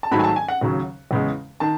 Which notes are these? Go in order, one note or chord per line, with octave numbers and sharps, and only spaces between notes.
A5
G#2 D#3 F#3 A3 B5
G#5
A5
G#5
F#5
D#2 C#3 F#3
E2 C#3 G#3
D#3 A5